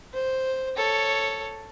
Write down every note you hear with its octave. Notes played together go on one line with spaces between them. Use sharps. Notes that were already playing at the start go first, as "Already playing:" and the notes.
C5
A4 C#5